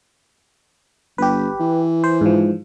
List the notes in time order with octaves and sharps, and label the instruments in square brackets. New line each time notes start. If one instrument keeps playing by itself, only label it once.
[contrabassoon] G1 [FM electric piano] G4 B4
[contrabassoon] E3
[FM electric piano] C5
G#2 F3